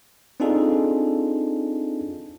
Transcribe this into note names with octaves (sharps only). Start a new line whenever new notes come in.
C4 D4 D#4 F4 G#4 A4